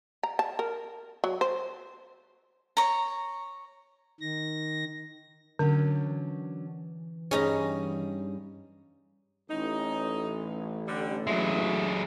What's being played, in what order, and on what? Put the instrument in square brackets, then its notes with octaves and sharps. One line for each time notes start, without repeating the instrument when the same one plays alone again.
[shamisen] A#5
A5
A#4
F#3
C5
[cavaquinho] C#5 A#5
[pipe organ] D#3 A#6
[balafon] D3 [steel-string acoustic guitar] F#3 C#4 D4
[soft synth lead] E3
[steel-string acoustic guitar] G2 G3 G#4 [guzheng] C#4 D#4 A#5
[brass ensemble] A1 [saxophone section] D#4
[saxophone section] D3 G3
[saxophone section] D2 D#5 E5 [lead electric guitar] F#3 G#3